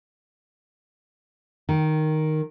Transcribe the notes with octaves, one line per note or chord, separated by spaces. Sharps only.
D#3